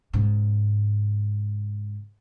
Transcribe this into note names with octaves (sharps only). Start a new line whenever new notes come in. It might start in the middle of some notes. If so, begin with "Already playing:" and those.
G#2 C#3